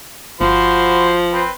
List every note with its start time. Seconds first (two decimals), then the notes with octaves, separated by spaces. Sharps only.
0.41 G1 F3 F#4 C5 B5
1.31 C4 B4 C5